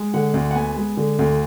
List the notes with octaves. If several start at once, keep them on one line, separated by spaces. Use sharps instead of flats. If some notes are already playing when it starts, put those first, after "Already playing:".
Already playing: G#3
D3 F#5
D2
F#5
B3 G#5
G#3
D3
D2